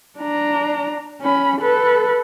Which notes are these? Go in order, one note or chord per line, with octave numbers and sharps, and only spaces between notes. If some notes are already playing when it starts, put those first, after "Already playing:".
D4 A#5
C#4 B5
A4 B4